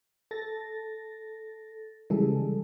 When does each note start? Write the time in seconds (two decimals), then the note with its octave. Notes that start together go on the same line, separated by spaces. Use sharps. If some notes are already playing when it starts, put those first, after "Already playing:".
0.31 A4 A6 A#6
2.10 C#3 E3 G3 G#3 G#4 A4